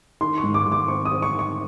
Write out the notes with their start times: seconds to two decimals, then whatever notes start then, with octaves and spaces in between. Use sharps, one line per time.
0.21 D#3 C6
0.38 C#6
0.43 G#2
0.54 D6
0.66 G#2
0.72 D6
0.88 C4 C#6
1.05 D#6
1.11 C4
1.22 C#6
1.33 D#3
1.39 C#6